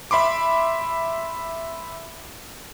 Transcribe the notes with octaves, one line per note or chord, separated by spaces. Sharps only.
E5 B5 C6 D6